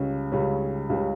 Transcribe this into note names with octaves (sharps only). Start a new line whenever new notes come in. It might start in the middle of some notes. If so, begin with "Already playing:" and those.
Already playing: C#2 C#3 G3 C#4
C#2 C#3 G3 C#4
C#2 C#3 G3 C#4